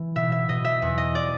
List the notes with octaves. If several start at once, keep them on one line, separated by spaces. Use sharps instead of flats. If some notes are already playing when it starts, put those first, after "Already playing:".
Already playing: E3
B2 E5
E5
B2 D#5
E5
E2
D#5
D5